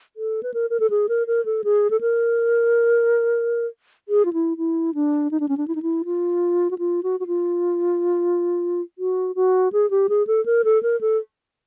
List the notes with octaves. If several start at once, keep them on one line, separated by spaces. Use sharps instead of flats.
A4
B4
A#4
A#4
A4
G#4
A#4
A#4
A4
G#4
A4
A#4
G#4
F4
E4
E4
D4
D#4
D4
C#4
D4
E4
D#4
E4
F4
F#4
F4
F#4
F#4
F4
F#4
F#4
G#4
G4
G#4
A4
A#4
A4
A#4
A4